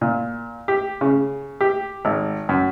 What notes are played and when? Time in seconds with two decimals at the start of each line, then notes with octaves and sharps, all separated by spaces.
0.01 A#2
0.68 G4
1.01 C#3
1.61 G4
2.05 G#1
2.49 F#2